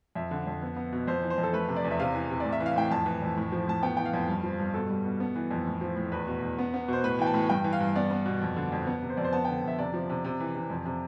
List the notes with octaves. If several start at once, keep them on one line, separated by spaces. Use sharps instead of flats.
F2 E5
D3
F2
B3
B3
B2
F2 C5
E3
C5
F2
A4
A3 B4
C3
D5
E2
E5
C3 F5
E3
C3
A2 D5
E5
E3
F5
A2 G5
F2 A5
E3
F2
A2
F3
A2 A5
B3 G5
E3 G5
F5
F2
G2
F3
G2
B2 A4
G3
B2
B3
E3
F2
A2
F3
A2
E2 B4
B2
E2
B3
B3
B2 C5
A2 B4
E3 G5
A5
A2
G2 G5
E3
F5
G2
B3 D5
B3
B2
F2
D3
F2
B3
C3
C5
F2 D5
C5
B3 A5
D3 G5
F2 E5
C3 D5
F3
C3
C3
E3
C3
F2
C3